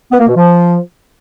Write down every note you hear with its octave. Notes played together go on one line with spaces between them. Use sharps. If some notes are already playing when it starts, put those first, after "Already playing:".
B3
A#3
B2
F3